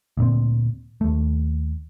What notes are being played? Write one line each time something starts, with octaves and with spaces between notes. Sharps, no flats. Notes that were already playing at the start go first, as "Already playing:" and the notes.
D2 A#2 C4
D#2 A3